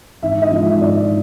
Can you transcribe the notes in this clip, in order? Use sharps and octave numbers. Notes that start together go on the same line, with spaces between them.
G#1 E5
D#5
G#2 F3
E5
G#1 D5